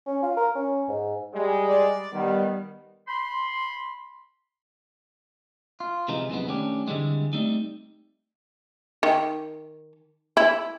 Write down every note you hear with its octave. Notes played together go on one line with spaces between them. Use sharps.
C#4
F4
A#4
C#4
G#2
G3 G#3
D5
D#3 G3 B3
B5 C6
F4
C3 E3 F3 G#3 D#4
F#2 C3 F3 G#3 B3
D#3 A3 C#4 D4 G4
D3 E3 G3 G#3 C4
G3 A3 C4 D#4
D#3
E4